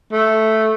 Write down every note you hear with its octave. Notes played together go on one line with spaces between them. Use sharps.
A3